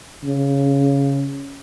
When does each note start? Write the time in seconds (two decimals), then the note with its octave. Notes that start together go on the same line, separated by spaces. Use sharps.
0.25 C#3